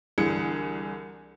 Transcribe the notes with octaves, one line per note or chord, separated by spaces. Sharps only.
C2 D3 E3 G#4 C#7